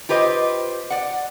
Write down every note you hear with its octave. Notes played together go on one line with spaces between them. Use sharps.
F4 G4 B4 C5 D#5
D5 F#5